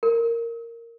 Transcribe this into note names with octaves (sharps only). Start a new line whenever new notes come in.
A#4